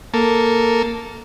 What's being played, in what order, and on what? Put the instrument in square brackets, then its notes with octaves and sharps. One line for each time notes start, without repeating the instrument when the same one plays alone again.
[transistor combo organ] A#3 A4